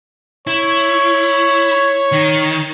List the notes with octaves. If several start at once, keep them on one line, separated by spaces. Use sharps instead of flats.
E4 C#5
D#3